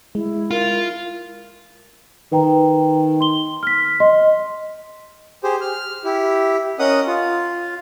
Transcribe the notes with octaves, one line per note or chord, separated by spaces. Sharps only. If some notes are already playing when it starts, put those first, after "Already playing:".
G#3 E4
F4 A#4
D#3 B4 G5 A#5
C6 G7
F6 B6
D#5 C6
G4 G#4 C5
F6
E4 G4
C#4 A#4 D#5 F#5 D#6
F4